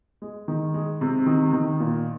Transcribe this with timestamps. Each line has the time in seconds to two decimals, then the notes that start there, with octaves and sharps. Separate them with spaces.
0.22 G#3
0.48 D#3
0.74 G#3
1.01 C3
1.26 D#3
1.53 D#3
1.80 A#2